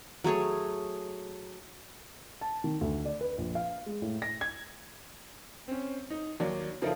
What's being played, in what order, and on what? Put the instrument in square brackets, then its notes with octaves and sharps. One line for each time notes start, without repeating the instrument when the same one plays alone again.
[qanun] F#3 A3 G#4 C#5
[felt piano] A5
D#3
D2
D5
B4
A#1
F5
G#3
A2
A#6
G#6
[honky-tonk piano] C4 C#4
D#4
D#2 F#3 A#3 D5
C#3 F3 D#4 E4 A4 A#4